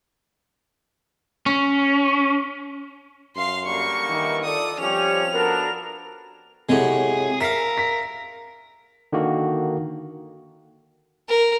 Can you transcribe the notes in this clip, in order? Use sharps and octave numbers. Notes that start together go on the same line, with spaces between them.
C#4
F#2 F5 C6
D3 G3 A#3 C#6
D#3 E3
F4 A4 D5 D#6
F3 G3 C4 C#4 G4 F7
B3 D4 F#4 A4 A#4
A2 C3 F#3 G#3 G#4
A#4 E5 F5 B6 C7
B6
D3 D#3 A#3 F#4
A#4